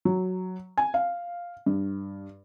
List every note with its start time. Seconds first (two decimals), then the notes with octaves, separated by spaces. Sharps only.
0.05 F#3
0.78 G#5
0.94 F5
1.66 G2